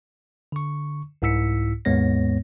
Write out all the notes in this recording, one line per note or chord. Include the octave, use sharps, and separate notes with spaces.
D3 C#6
C2 G#2 E4 E6 B6 C#7
D#2 G#2 G#3 B3 C#5 A#6